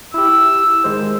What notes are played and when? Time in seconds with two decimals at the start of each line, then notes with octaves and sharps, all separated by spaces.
0.14 E4 G4 E6
0.84 D#3 G#3 C5